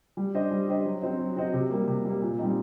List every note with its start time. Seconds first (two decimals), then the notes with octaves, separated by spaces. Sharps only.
0.17 G3
0.34 D4 G4 C5 D#5
0.51 G3
0.68 D4 G4 C5 D#5
0.85 F#3
1.02 C4 F#4 C5 D#5
1.19 F#3
1.36 C4 F#4 C5 D#5
1.53 C3
1.70 G3 A#3
1.87 C3
2.05 G3 A#3
2.22 A#2
2.38 G3 C4 D#4